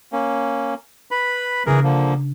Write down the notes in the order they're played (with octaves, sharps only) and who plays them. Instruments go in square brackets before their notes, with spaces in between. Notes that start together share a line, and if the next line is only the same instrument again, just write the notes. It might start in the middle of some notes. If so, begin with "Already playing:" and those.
[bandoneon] A#3 C#4
B4 B5
[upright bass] C#3 D4 [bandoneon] E3 G#4 A#4
[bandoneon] D3 F3 A#3